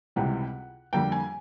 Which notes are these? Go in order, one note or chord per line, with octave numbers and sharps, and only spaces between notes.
C#2 C3 E3 G3 F#5
F2 D3 G3 A#3 G5
G#5